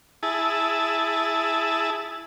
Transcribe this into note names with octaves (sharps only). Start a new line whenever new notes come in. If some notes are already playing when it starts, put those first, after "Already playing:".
E4 G#4 A5